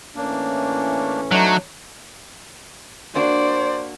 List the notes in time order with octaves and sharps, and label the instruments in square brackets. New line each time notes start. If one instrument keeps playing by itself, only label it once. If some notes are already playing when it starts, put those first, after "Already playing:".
[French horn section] A2 E3 C#4 [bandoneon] A#3 D4
[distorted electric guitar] F#3 [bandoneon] A3 D4 D#4
[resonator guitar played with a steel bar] A#3 D4 F#4 [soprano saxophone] C5 [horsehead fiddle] D5